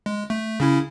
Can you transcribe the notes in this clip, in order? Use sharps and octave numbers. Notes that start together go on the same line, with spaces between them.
G#3
A3
C#3 C#4 E4